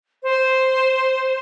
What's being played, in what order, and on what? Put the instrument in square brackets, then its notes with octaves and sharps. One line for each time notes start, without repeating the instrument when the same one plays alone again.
[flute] C5